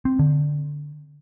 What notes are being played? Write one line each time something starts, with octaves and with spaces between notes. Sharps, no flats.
C4
D3